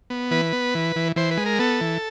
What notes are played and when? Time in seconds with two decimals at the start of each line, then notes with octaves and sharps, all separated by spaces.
0.10 B3
0.31 E3 B4
0.53 B3
0.75 E3
0.96 E3
1.16 E3 C5
1.31 B4
1.37 G#3
1.46 A#4
1.59 B3 A4
1.81 E3